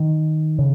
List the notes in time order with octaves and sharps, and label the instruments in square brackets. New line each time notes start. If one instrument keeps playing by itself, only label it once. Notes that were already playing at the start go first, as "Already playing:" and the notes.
Already playing: [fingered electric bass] D#3
C#3